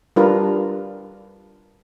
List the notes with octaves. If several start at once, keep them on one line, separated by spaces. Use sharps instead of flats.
G3 D4 F4 A#4 B4